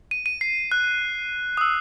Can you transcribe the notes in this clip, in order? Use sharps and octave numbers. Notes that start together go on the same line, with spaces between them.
D#7
D#7
C7
F#6
D#6
E6